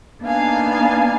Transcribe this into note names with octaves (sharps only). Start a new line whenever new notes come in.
A#3 B3 D4 D#4 F5 G#5